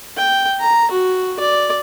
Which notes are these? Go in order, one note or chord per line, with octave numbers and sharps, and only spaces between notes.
G5
A#5
F#4
D5